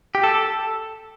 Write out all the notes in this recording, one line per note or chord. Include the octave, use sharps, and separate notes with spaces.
G4
A4